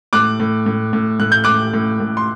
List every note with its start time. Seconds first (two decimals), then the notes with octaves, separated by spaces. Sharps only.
0.13 A2 D6 F#6
0.40 A2
0.66 A2
0.93 A2
1.20 A2 F#6
1.32 G6
1.44 A2 D6 F#6
1.74 A2
2.00 A2
2.17 C6